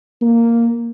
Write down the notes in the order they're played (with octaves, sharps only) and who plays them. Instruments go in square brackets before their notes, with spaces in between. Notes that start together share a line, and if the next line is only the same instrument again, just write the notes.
[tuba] A#3